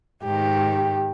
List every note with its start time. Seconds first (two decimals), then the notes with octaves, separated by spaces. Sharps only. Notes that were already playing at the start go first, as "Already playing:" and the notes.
0.23 G#2 D#3 G4